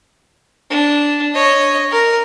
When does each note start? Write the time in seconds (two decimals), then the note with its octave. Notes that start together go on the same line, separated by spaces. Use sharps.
0.70 D4
1.34 C#5 D#5
1.91 A#4